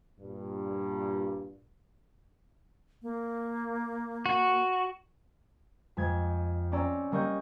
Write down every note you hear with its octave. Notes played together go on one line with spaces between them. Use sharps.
G2 A#2
A#3
F#4
F2 G#3 G#6
C4 C#4 D5 A#5 E6
G3 A#3 D#5 C#6 G6